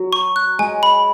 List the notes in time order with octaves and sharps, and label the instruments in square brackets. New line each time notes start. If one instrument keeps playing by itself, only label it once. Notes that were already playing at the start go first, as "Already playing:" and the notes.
Already playing: [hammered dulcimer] F#3
[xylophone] C#6
F#6
[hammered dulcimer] G#3 [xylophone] G#5
[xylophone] B5